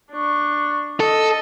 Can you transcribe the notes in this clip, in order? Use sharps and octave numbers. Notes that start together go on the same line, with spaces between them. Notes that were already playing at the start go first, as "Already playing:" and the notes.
D4 C#6
A4 D#5